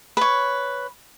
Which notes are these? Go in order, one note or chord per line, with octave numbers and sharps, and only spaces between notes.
B4 C#5